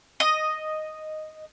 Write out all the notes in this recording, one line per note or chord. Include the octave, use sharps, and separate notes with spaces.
D#5